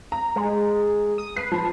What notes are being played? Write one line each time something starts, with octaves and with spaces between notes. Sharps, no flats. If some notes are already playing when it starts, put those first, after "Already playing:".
A#5
G#3
D#6
B4 C7
F3